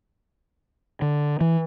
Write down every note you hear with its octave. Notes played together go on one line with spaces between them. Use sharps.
D3
E3